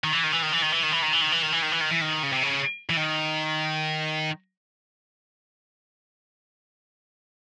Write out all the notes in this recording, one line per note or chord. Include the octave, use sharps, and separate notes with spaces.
D#3
E3
D#3
E3
D#3
E3
D#3
E3
D#3
E3
D#3
E3
D#3
E3
D#3
E3
D#3
E3
D#3
E3
D#3
C#3
C3
C#3
E3
D#3